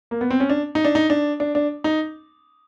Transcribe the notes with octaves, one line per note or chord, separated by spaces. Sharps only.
A#3
B3
C4
C#4
D4
D#4
D4
D#4
D4
D4
D4
D#4